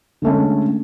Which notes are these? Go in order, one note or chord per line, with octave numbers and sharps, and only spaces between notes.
D3 G#3 A3 C#4